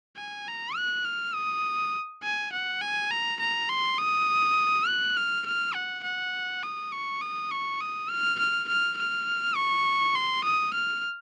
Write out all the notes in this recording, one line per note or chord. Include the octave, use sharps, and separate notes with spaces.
G#5
A#5
F#6
F6
D#6
G#5
F#5
G#5
A#5
A#5
C6
D#6
F#6
F6
F6
F#5
F#5
D#6
C#6
D#6
C#6
D#6
F6
F6
F6
F6
C#6
C6
D#6
F6